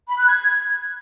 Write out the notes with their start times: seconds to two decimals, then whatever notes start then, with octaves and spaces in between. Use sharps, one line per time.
0.07 B5
0.17 F#6
0.27 G#6